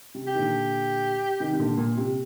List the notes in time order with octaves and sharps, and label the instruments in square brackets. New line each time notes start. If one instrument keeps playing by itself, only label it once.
[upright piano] C3
[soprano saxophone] G4
[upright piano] D#3
A#2 D3
C3 D#3
C3
A#2 D3
A#2
C3